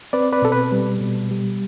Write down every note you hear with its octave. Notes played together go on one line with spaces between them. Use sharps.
C4 B4 D5
B4 D5
B2 A4
B4
G3
B2
G3